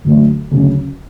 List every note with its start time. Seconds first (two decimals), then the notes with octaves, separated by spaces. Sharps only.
0.05 D2 D3 F#3 A3
0.51 D2 C#3 F#3